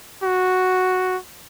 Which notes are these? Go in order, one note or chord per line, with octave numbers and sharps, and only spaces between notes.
F#4